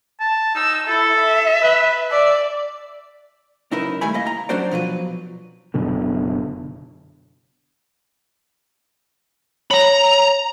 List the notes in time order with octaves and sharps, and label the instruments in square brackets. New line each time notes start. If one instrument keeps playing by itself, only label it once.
[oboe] A5
[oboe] D#4 [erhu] E6
[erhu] E4 [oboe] A4
[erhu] E5
[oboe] B4
[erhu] D5 [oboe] E5
[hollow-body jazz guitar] C#2 F#2 D#4 E4 A#4 B4
D#2 G3 A3 G#5 B5
A#3 E4 D#5
A#5
F#3 C#4 D4 F#4 C5 D5
B2 F3 F#3 B4
[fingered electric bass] F#1 F#2 B2 D3
[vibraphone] C#5 [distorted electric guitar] A#5 B5